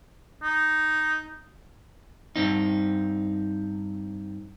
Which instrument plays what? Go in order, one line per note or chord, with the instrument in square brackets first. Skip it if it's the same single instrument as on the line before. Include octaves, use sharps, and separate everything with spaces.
[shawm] D#4
[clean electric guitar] G2 C4 D#4